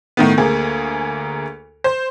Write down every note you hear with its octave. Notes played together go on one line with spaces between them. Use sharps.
A2 D#3 B3
D2 A#3 G#4
C5